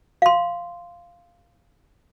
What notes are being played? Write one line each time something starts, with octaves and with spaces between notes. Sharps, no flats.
F5 C6